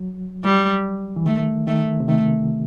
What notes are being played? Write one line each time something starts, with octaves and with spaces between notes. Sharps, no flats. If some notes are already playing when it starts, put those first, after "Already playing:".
Already playing: F#3
G3
E3
D#3 A3
D#3 A3
C3
D#3 A3